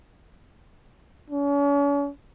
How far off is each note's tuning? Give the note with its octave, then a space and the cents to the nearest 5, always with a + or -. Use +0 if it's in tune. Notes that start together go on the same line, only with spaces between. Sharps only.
C#4 +40